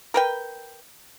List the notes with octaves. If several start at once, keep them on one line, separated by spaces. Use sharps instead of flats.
A#4 B4 G5